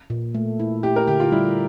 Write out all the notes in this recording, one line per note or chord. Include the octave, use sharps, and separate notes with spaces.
A#2
A3
E4
E4 G4
A#4
D3 G4
F4
G3 E4